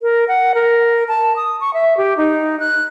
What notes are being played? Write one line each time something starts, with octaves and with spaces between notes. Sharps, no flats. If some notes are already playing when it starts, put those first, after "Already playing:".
A#4
F#5
A#4
A5
D#6
C#6
E5
G4
D#4
F#6